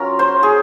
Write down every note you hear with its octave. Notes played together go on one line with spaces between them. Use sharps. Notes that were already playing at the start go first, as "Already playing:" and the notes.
Already playing: F#3 C#4 F4 A#4
C5
G#4